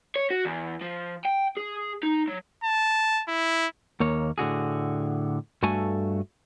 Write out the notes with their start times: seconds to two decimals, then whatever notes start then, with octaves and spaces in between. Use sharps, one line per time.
0.16 C#5
0.30 F#4
0.45 E2
0.81 F3
1.25 G5
1.57 G#4
2.03 D#4
2.28 F#3
2.64 A5
3.28 E4
4.00 D#2 A#3 C#5
4.38 A2 D3 F#4 G#4
5.63 G2 A3 F#4 A4 G#5